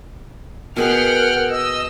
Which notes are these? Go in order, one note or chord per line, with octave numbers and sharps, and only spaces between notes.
B2 G#4 A#4 F#5 G5 B5 F6
D#5 E6